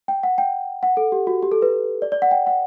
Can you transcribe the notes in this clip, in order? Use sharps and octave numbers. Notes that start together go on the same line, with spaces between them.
G5
F#5
G5
F#5
A4
G4
F#4
G4
A4
B4
D5
D5
F#5
G5
F#5